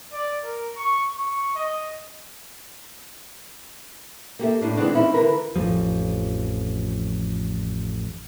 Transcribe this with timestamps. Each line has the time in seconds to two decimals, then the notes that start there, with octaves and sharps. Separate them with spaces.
0.12 D5
0.44 A#4
0.77 C#6
1.16 C#6
1.56 D#5
4.39 A#3 G4 A4 E5
4.61 A2 D4 C#5
4.77 E3 F3 G#3 B3 C4 D4
4.93 C4 C#4 D#4 E4
5.14 D3 E3 A#4 B4
5.56 A1 F2 F3